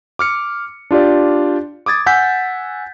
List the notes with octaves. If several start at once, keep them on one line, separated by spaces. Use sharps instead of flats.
D6 F6 C#7
D4 F4 G4 D5
D6 D#6 G#6 A6
F#5 G#5 E6 G6 B6